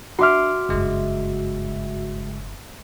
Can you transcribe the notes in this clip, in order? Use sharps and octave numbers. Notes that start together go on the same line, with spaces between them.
D4 F#4 E5 C6 D6 F6
F#1 G2 C#3 G#3